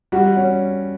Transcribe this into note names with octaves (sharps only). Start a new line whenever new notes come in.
G3 F#4
C#4